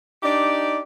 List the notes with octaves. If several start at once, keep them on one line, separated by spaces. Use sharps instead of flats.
D4 D#4 G4 D5